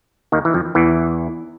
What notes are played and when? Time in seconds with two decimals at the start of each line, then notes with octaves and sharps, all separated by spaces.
0.32 D#2 D#3
0.45 E3
0.54 F2 F3
0.75 E2 E3